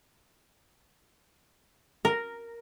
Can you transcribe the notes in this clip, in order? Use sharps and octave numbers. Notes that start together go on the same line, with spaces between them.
A#4